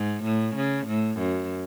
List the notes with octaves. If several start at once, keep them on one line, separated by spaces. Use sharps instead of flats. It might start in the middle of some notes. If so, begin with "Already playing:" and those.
Already playing: G#2
A2
C#3
A2
F#2